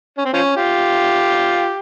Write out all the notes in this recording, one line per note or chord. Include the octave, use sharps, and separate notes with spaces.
C#4
C4
F3 C#4
F4 G4